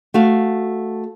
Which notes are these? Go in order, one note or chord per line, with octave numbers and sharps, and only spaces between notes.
A3 F#4 F5